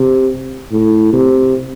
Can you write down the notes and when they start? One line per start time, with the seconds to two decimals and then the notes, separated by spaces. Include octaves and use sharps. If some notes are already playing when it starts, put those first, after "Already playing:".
Already playing: C3
0.72 A2
1.13 C3